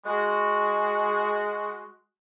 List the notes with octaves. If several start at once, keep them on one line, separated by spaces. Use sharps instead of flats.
G#3 F#4